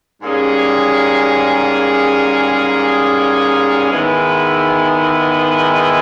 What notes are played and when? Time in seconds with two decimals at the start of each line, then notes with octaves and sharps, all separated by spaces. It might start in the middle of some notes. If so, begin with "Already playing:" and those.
0.22 G#2 G3 A#3 C#4 G#4
3.90 G#2 D#3 G#3 B3 E4